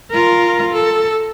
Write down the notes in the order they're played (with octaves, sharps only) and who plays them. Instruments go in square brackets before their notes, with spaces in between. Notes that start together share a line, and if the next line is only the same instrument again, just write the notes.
[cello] F4 A#4
A4